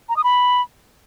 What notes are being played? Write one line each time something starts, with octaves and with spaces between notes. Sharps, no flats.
A#5
D#6
B5